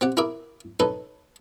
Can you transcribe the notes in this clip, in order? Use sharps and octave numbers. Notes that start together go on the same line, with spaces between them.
C4 G4 F#5
E4 G#4 A#4 E5 D6
C#4 D#4 A4 B4